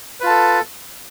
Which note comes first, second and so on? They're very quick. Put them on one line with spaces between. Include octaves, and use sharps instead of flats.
B4 F4 A5 A4